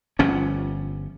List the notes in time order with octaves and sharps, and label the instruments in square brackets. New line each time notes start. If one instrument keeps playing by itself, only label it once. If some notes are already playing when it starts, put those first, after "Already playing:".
[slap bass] G1 G2 F3 C#4